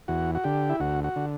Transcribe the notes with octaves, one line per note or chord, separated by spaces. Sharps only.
E2 F#4
F#4
D3 G4
E4
D2 F#4
F#4
D3